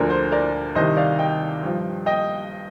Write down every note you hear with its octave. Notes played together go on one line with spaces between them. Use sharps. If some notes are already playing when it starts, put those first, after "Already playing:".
Already playing: D2 D3 F3 A#4 D5
C5
A#4 D5
C2 C3 D#3 C5 D#5
D5 F5
D#5 G5
G2 F3
D#5 G5